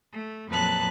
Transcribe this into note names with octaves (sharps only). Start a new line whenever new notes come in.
A3
F2 A#2 F#3 B4 A5 F#6